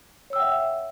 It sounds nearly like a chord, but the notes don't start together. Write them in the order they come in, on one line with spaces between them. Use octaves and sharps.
C#5 E6 G5 F#5 E5